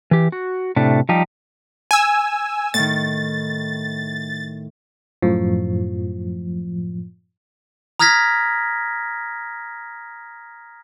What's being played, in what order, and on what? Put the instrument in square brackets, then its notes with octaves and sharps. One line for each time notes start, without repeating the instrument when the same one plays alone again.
[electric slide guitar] E3 G4
F#4
A2 C3 A3 D4
F3 G3 D#4 G4
[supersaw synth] G#5 E6
[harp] A2 D#3 [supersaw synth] A6
[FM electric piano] F#2 A2 F3
[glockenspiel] A#5 D#6 F6 G#6 A#6 B6